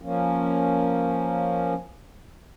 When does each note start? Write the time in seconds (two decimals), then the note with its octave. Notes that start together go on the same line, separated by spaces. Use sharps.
0.02 F3 A#3 C#4